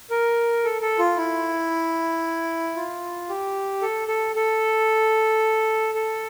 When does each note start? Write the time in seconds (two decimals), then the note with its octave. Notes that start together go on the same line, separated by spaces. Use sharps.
0.10 A#4
0.64 A4
0.82 A4
0.99 F4
1.17 E4
2.76 F4
3.29 G4
3.81 A4
4.08 A4
4.35 A4
5.94 A4